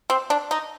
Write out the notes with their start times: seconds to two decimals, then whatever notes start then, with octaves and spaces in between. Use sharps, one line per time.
0.10 C4
0.30 D4
0.51 D#4